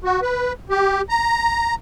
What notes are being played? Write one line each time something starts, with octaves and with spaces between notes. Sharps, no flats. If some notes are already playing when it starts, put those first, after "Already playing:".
F#4
B4
G4
A#5